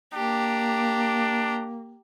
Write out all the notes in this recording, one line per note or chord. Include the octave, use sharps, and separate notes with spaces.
A#3 D4 G4 A#5